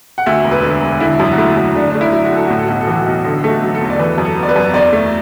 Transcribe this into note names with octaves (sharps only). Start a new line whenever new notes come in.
F#5
D2 E5
E1
B4
D3
E1
D3 E4
F#2
F#4
A3 E4
F#2
D3 D4
D4
A3
E4
F#3
F#4
D2 A4
A2 F#4
A4
B1 F#4
A4
E3 F#4
B1
D3 A4
A3 A4
F#4
F#3
A4
E2
D5
E3 B4
F#2
A4
B3
D5
B4
F#2
E2 D5
A3